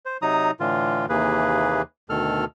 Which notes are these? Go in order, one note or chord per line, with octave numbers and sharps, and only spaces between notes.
C5
C3 F#3 D#4 A#5 D#6
A2 D3 E3 F4
D#2 C3 E3 A#3 G#4 B4
D2 B2 D#3 A4 F6